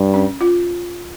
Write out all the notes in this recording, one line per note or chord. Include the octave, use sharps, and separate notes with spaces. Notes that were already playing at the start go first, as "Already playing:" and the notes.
Already playing: G2
C#4
F4